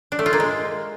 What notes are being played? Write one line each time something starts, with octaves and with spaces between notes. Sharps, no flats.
D4
A3
F4
A#3
G#3